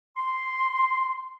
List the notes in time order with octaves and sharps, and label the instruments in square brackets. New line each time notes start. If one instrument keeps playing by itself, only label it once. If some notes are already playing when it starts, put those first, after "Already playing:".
[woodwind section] C6